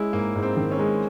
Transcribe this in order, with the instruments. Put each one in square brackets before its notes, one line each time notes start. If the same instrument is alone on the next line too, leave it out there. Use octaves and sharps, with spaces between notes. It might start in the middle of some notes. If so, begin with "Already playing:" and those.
Already playing: [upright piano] G#3 [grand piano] C#4 E4
[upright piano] G#2 [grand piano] A#3
[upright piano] G#2
[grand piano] C4
[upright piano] D#3
[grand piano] C#4
[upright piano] G#3